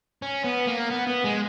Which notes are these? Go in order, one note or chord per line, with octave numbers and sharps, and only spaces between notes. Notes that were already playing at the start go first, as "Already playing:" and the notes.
C#4
B3
A#3
B3
B3
G#3